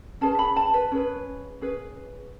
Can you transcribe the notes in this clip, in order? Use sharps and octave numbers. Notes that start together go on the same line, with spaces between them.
C#4 G#4 B4 A5
B5
A5
B4
C#4 G#4 B4
C#4 G#4 B4